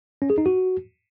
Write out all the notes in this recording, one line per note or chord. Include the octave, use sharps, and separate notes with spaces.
C#4
G#4
D#4
F#4